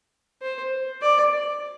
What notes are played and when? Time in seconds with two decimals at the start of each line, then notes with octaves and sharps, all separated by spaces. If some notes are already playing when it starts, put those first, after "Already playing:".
0.42 C5
1.02 D5